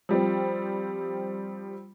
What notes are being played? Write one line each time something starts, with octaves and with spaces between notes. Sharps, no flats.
F3 G3 C4